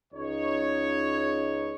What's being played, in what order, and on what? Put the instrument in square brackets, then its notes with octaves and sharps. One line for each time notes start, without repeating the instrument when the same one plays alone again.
[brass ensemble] C#2 D#4 C#5